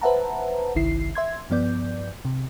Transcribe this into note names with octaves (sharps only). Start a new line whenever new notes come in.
B4 C5 E5 F#5 A5 A#5
G1 C2 D#3 E4 C7
E5 C6 G#6
G2 F3 B3 D5 G6
C3